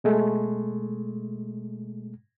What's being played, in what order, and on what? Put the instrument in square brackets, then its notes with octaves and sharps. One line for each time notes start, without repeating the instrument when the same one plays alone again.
[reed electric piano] B2 G#3 A3